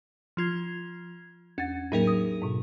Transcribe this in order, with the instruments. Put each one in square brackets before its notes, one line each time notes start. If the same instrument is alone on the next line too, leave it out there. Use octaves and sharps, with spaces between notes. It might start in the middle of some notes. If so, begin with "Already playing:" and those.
[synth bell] F3 F4 G#6
[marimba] E2 F#5 A6 [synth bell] C#4
[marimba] A2 F#3 A#3 [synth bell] D#4 G#4 A#4
[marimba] D#6
G#2 B2